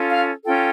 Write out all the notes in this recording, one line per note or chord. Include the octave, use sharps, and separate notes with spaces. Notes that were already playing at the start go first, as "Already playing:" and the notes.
Already playing: C#4 F4 A4
F5
C#4 F4 A4 G5